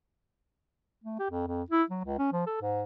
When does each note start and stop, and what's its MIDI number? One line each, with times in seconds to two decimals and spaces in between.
1.04 1.18 57
1.19 1.27 67
1.30 1.45 41
1.47 1.63 41
1.71 1.83 64
1.90 2.02 54
2.04 2.18 37
2.19 2.31 61
2.32 2.45 53
2.46 2.60 69
2.61 2.84 44